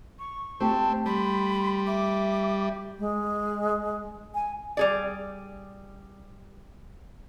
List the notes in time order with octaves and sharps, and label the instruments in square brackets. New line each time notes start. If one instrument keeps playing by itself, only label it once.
[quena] C#6
[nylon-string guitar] A3 G4 [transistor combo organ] C4 [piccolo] A5
[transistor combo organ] G3 [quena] B5 [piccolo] C6
[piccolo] E5 [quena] D6
[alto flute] G#3
G#5
[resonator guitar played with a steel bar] G3 G#4 D5